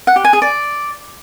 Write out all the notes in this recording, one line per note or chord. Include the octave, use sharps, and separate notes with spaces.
F#5
G4
G#5
G#4
D5